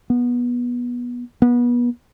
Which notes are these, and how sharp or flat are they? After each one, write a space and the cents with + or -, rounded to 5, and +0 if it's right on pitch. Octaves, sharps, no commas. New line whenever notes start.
B3 -20
B3 -30